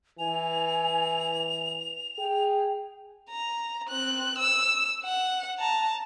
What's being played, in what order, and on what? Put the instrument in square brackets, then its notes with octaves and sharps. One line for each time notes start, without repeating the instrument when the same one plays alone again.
[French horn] E3 [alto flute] G#5 [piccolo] F7
[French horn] G#4 [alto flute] G5
[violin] A#5
C4 F#6
E6
F#5
A5 A#5